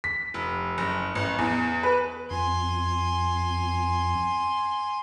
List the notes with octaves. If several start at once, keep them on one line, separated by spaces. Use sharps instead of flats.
B6
F1
F#1
A1
E2
B4
F2 G#5 C6